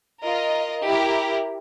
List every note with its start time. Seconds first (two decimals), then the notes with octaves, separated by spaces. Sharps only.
0.22 F4 A#4 D#5
0.84 E4 G4 A#4